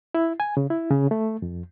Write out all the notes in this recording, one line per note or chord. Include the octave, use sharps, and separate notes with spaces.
E4
G#5
C#3
E4
C#3
A3
F2